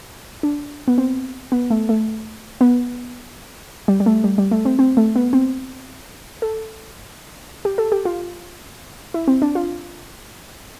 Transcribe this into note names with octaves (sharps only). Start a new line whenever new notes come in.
D4
B3
C4
B3
A3
A3
B3
G3
G3
A3
G3
G3
A3
C4
C4
A3
B3
C4
A4
G4
A4
G4
F4
E4
C4
D4
F4